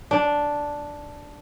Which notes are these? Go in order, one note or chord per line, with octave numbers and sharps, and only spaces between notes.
D4